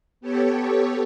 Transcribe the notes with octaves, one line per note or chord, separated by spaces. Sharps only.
B3 G4 A4 C#5